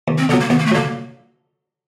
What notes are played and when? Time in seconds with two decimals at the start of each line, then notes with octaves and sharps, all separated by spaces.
0.08 D#2
0.18 C4
0.29 D3 B3
0.33 F#3
0.40 A#3
0.50 D#2 B3
0.59 A#3
0.66 A3
0.71 D3 F#3 A#3